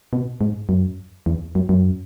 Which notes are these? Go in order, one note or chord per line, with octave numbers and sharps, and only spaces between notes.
B2
G#2
F#2
E2
F#2
F#2